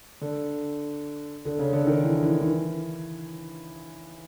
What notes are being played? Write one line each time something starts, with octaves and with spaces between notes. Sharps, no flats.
D3
D3
C#3
D3
D#3
E3
E3
E3